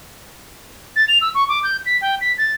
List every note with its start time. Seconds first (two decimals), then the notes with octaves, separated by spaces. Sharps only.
0.96 A6
1.08 F7
1.21 E6
1.35 C#6
1.49 D6
1.63 G6
1.86 B6
2.01 G5
2.21 B6
2.38 A6